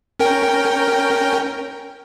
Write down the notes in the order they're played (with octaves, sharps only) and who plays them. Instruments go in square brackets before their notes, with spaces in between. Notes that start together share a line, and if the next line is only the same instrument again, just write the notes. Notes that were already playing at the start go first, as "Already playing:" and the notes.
[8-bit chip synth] C#4 A#4 G5